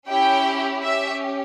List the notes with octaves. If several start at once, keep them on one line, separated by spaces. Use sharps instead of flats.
C#4 E4 G4 G5
C#4 G4 E5